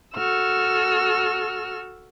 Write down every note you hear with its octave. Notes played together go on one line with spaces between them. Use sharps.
F#4 A4 E6 F6